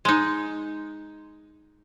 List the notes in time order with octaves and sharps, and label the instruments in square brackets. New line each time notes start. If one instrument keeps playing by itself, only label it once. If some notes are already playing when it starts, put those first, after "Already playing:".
[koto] G#3 D#4